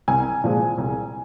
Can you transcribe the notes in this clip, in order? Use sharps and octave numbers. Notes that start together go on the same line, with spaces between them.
C2 G#5
A#2 F3 G#3
C2